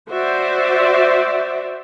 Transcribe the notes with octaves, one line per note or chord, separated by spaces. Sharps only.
F#4 C5 D5 E5